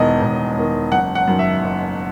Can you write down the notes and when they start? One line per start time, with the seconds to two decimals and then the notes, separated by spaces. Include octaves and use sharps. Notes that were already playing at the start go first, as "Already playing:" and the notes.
Already playing: E1 E2 D#3 D#5
0.22 E1
0.57 E2 D#3
0.92 F#1 F#5
1.15 F#5
1.27 F#2 D#3
1.39 E5
1.62 F#1